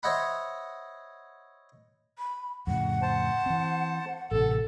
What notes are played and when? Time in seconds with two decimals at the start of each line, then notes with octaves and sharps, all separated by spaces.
0.03 C5 C#5 D#5 E5 F#5 B5
2.18 B5
2.67 F2 A2 C#3 F#5
3.02 C5 A5
3.46 E3 C4
4.31 A1 C3 A4